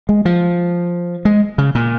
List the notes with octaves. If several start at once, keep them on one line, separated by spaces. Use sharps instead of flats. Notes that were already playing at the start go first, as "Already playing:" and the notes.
G#3
F3
G#3
C#3
A#2